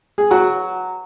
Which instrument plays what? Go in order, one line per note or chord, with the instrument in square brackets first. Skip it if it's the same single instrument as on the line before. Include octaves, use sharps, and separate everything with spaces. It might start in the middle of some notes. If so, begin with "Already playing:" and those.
[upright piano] G#4
[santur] F#3 [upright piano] F#4